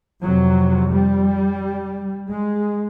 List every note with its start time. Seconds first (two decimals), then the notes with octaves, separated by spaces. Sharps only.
0.21 F2 C3 F#3
0.91 G3
2.29 G#3